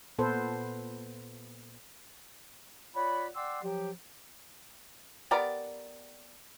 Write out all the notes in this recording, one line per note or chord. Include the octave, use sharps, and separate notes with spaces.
A#2 B3 A4 B4 C5
F4 C#5 D5 F#5 B5
D5 F#5 G5 C6 D6 E6
F3 F#3 G4
B3 G4 A#4 D5